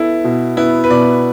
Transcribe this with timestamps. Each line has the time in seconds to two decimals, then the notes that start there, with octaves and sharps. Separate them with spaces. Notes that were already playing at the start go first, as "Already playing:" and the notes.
Already playing: B3 E4 A4
0.24 B2
0.57 B3 E4
0.84 B4
0.90 B2 D5